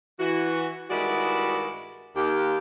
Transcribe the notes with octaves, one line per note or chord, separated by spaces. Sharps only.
E3 F#4
G2 D#3 G#3 E4 F#4 D5
D#2 G4